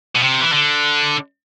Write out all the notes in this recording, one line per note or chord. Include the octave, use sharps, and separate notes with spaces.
B2
C3
E3
D3